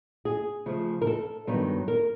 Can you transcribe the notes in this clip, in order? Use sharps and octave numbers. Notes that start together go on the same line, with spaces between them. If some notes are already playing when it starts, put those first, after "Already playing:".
G#4
C#3 F3 A3
A#4
A4
G2 D#3 F#3 B3
A#4